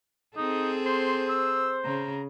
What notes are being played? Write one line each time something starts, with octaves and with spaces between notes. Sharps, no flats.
C4 D#4 G#4 A4
C5 C6
E6
C#3 A#5